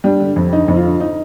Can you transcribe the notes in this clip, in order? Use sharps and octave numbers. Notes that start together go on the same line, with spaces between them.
G3 D4
D3
F2
D3 D#4
F2
F4
D3
D#4